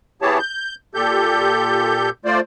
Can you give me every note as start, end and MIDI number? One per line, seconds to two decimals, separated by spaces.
0.22 0.39 59
0.22 0.39 64
0.22 0.39 67
0.22 0.39 68
0.22 0.39 73
0.22 0.39 81
0.39 0.75 91
0.95 2.10 46
0.95 2.10 67
0.95 2.10 69
0.95 2.10 91
2.25 2.40 57
2.25 2.40 65
2.25 2.40 72
2.25 2.40 74